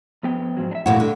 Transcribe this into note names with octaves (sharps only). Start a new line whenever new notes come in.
F2 B3 G5
G#2 F3 F#3
D4 E5
F2 A#2 A3 E4 F#4
D3